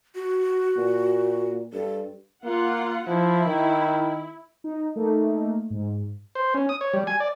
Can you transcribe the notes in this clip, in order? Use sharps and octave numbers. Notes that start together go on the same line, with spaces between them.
F#4
A#2
G2 A4
A#3 F4 F#5
F3 E4
D#3
D#4
A3 A#3 D#4
G#2
C5
C#4
D#6
C#5
G3
G#5
D5